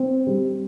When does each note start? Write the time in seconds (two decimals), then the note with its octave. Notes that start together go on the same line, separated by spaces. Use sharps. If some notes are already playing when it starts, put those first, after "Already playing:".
Already playing: C4
0.27 G3